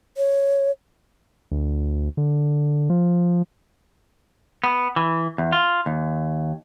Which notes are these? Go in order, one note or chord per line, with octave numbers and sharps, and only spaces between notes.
C#5
D2
D3
F3
B3
E3
E2
F4
D#2